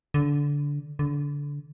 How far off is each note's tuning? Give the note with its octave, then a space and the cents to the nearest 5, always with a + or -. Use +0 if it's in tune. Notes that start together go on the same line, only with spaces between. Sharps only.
D3 -20
D3 -25